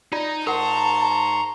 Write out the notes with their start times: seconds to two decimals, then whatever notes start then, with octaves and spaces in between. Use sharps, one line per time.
0.13 D#4 F4 D5
0.47 G#2 A#4 F#5 A5 A#5 C6 C#6